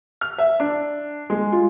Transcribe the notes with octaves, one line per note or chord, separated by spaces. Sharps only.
F6
E5
D4
G#3
F4